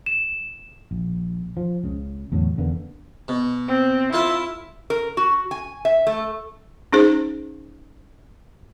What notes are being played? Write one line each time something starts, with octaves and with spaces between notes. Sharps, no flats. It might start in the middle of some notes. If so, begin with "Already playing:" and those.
E7
A#1
F3
C#2 C#3
E2 A2 D3 F#3
E2 D3 A#3 B3
B2
C4
E4 F4 A4 F5
A#4
F#4
G#5
E5
A3
C#4 D#4 G#4 C5